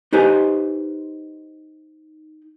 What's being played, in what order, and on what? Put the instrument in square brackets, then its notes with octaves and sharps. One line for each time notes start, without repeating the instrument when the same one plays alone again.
[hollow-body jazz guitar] D#4 G4 B4 C5 G#5